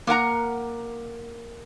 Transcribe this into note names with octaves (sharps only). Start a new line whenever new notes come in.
A#3 A#4 F#5 A#5